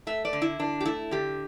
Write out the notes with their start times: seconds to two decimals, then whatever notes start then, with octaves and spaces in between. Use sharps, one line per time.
0.07 A3 E5
0.25 D5
0.33 D3
0.42 E4
0.59 D3 D4
0.81 G4
0.85 A3 E4
1.11 D3 G4